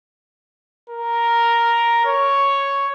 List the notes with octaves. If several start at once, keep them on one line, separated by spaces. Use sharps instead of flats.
A#4
C#5